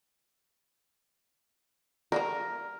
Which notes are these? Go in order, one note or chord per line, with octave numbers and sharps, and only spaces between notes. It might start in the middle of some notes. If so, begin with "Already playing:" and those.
G3 G#3 A#3 A#4